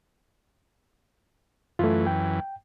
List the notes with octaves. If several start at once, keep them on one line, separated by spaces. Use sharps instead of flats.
F#2 E3 A3 F4
G5